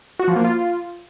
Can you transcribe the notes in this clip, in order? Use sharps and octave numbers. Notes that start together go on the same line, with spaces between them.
F#4
F3
A#3
F4